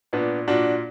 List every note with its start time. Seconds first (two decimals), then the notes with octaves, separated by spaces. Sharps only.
0.13 A#2 B3 D4
0.48 A#2 D4 F#4